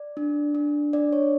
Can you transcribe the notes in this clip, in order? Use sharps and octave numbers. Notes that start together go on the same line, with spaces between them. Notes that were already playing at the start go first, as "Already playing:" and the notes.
Already playing: D5
D4
D4
D4 D5
C#5